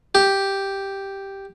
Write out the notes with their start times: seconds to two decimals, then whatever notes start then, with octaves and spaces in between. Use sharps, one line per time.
0.15 G4